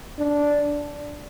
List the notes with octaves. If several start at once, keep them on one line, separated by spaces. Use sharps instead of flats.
D4